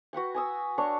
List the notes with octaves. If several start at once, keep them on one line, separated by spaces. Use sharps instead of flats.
F#4 B4 F#5 G5
G#5 D#6 E6
D4 C#5 C#6